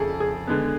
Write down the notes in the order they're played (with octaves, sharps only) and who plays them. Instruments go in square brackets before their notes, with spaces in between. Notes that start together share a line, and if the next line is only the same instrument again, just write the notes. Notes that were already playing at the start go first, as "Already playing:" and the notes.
Already playing: [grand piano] F2 C#3 G#4 A4
G#4
D3 G#3 B3